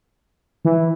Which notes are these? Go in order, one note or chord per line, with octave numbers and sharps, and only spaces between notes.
E3